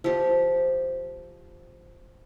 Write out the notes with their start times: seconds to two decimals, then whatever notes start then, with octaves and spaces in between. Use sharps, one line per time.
0.04 F3 G4